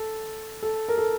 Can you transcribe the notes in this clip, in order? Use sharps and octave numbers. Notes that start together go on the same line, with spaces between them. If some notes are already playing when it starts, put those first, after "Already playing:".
Already playing: A4
A4
A#4
A4